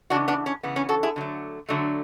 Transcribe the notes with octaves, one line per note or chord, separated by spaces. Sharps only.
C#3 E3 B3 D4 F#4
B3 D4
C#4
C#3 E3 B3
C#4
F#4 A4
E4 G#4
D3 F#3 A3
D3 F#3 A3